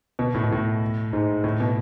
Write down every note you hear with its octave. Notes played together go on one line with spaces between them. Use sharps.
B2
A2
B2
A2
G#2
A2
B2